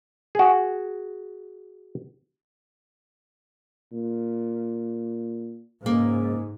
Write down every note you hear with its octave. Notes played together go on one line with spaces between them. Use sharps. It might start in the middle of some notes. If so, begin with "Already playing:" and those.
F#4 G#4
A#2
G#2 C#3 A#3